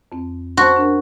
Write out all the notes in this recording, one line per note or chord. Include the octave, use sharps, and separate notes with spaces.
F2 C4
F#4 C5 A5 C6
D4 A#4